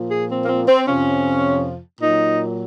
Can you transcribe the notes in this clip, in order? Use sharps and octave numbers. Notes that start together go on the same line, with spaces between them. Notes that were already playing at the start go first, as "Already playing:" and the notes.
Already playing: A#2 F3
G#4
C4
A#3
C4
C4
F2 C3 F3 C#4
A#2 F#3 D#4